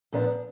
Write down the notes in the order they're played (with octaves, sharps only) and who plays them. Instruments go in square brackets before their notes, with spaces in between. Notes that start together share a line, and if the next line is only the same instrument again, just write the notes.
[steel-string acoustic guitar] A#2 F3 B3 D4